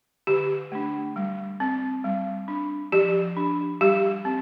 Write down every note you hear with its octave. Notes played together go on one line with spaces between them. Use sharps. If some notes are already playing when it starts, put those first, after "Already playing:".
D3 G4
A3 D4
G3
C4
G3
D4
F3 G4
D4
G3 G4
C4